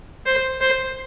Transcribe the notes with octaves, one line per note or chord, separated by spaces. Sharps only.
C5
C5